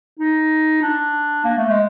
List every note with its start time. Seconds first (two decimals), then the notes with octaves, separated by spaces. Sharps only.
0.19 D#4
0.82 D4
1.44 A#3
1.57 A3
1.69 G#3